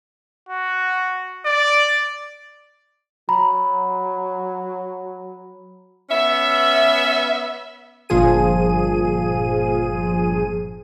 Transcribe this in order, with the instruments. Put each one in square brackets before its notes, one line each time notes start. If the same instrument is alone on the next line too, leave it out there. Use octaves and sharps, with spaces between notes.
[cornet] F#4
D5
[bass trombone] F#3 [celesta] A#5 B5
[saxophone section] B3 C#4 E5
[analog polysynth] G1 G2 A#2 F3 G#4 D#7